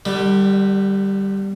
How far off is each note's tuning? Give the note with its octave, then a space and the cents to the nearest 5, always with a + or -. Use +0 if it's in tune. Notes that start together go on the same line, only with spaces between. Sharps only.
D3 +40 G3 +0